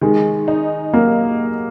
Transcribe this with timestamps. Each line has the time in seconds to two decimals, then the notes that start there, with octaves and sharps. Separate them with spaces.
0.01 D#3 G#3
0.48 D#4
0.93 F#3 A#3